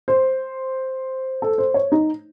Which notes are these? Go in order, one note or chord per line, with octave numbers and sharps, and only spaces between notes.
C5
A4
C5
C#5
D#4